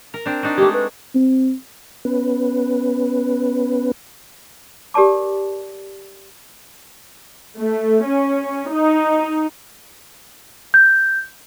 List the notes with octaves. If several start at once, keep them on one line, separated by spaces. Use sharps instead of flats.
A#4
C4 D4
D4 D#4 F#4
G#3 A3 G4
B4
C4
B3 C#4 B4
G4 A#4 D5 A5 D6
A3
C#4
D#4
G6